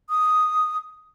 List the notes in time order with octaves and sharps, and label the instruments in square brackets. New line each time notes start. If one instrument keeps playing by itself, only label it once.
[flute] D#6